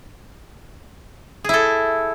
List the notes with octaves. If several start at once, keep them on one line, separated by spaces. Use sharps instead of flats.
E4 G#4 A4